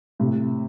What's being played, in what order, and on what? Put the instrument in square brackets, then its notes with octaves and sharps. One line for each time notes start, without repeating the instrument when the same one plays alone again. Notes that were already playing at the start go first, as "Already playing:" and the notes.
[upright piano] A2 C3